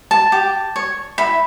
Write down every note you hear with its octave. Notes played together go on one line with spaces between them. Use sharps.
A5
G4
C#5
E4 B5